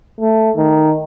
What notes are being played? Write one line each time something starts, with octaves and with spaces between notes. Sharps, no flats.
A3
D#3